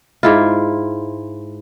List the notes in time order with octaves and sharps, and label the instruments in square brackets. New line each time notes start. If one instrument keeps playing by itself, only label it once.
[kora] G#2 E4 F4